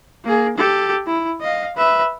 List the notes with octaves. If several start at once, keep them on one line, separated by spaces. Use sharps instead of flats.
A#3 G#4
G4 A4
E4
D#5 F5
B4 E5